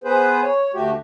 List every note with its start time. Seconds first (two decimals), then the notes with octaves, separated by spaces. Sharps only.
0.04 B3 G#4 B4 C5
0.42 C#5
0.74 D2 A3 F#4 G4